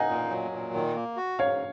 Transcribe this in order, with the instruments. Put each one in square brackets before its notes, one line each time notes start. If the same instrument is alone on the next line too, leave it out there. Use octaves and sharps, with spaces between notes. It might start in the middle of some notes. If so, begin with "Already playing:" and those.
Already playing: [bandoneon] D#4 [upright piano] D#5 F5 F#5 G#5
[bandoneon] A#2
F#3
A#2
D#3
A#3
F#4
[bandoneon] G#2 [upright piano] C#5 F5